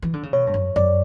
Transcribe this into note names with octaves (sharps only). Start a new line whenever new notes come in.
E3
D3
C#3
B2 C#5
G2
F#2
F#2 D5